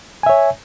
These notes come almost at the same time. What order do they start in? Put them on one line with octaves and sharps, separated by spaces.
G#5 E5 C#5